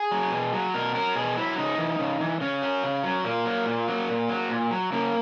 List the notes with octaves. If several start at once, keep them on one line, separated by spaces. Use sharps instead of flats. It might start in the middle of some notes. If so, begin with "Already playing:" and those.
Already playing: G#4
F#3
B2
F#3
B2 A#4
F#3 A#4
B2 G#4
F#3 E4
C#3 D#4
E3
C#3
E3
C#3 C#4
F#3
C#3
F#3
A#2 A#3
F#3
A#2
F#3
A#2
F#3
A#2
F#3
C#3 A#3